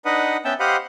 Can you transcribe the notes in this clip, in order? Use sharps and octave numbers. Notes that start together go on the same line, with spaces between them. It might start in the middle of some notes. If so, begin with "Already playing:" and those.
D4 D#4 B4 D#5 F#5
B3 C#4 E5 G5 A5
G4 C5 D#5 F5 F#5 B5